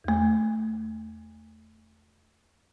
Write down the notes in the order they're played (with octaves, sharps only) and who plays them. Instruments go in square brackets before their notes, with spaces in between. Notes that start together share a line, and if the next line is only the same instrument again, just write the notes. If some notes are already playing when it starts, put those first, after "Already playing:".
[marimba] E2 A3